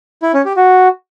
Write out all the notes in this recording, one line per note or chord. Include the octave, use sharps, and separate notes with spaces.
E4
C#4
G4
F#4